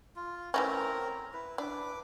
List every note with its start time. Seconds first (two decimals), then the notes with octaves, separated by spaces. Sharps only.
0.16 F4
0.54 E3 A3 C4 C#4 A#4 A#5
1.33 E4 B4
1.58 D4 B4 D6